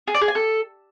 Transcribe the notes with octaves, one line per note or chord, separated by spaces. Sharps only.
G#4
D5
G#4
G#5
A4